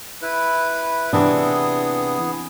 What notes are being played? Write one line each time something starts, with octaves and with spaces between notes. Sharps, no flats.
E4 B4
C3 E3 B3 D4 G#4